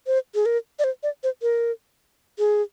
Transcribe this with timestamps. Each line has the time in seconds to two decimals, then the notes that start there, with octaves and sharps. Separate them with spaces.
0.07 C5
0.35 G#4
0.46 A#4
0.79 D5
0.84 C5
1.03 D5
1.23 C5
1.42 A#4
2.39 G#4